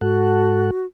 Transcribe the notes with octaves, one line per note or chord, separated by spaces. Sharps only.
G#2 F#4 A4 F#5